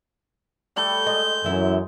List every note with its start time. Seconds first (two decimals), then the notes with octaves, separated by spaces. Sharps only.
0.76 G3 A3 A4 G6
1.07 G#3 D#5
1.44 F#2 E3 E4